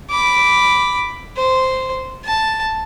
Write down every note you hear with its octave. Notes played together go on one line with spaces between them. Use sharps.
B5 D6
C5
A5